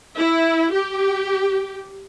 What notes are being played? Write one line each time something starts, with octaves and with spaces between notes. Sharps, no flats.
E4
G4